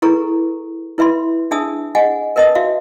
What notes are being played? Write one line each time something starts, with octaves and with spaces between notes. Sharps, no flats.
E4 G#4 A4 B4 A#5 C#6
E4 B4 E5 B5 C6
D4 G#4 E5 A5 D#6 E6
G#4 D#5 F#5 G#5
A#4 B4 D#5 A5 D#6
F#4 E5 F5